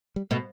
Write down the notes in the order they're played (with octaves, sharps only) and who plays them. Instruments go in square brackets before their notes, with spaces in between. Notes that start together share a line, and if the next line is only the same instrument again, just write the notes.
[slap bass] G3
[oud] B2 [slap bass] A3